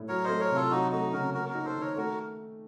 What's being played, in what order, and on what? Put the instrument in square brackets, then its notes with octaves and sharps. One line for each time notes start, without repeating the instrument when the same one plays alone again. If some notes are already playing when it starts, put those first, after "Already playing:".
Already playing: [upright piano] A2
[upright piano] F#3 [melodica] A#4 C#5
[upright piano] A3 [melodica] C5 D#5
[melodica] A#4 C#5
[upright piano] C3 [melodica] F4 A4
[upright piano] F#3 [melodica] D#4 F#4
[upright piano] A3 [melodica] D#4 F#4
[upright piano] C#3 [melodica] F#4 A#4
[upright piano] A#3 [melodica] F#4 A#4
[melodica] F#4 A#4
[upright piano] D#4
[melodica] A4 C5
[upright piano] D#3
[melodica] A#4 C#5
[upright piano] A3 [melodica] F#4 A#4